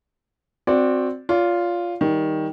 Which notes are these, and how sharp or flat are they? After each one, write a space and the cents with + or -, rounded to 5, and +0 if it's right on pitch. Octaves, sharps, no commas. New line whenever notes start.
C4 +0 F#4 -20 D5 +0
F4 +0 D5 -45
D#3 +10 G3 +0